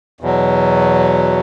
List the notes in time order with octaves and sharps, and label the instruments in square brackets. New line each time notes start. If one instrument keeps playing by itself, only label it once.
[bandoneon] E2 B2 F#3